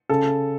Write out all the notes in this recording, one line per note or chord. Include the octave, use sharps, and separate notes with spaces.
C#3 A4